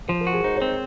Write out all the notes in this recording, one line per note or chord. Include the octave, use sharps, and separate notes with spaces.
F3 C5
A#4
F#4
G#4
D#4 C5
C#5
C4
C5